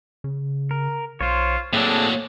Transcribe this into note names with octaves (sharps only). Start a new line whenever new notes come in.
C#3
A#4
B1 F4 C5 C#5
A2 F#3 A#3 C4 D4 G#4 A4